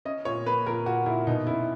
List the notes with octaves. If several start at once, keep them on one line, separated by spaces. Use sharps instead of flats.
C#4 D#5
A#2 C#5
A#3 B4
A#2 A#4
A#2 F#4
A#2 E4
B2 D#4
C#4 E4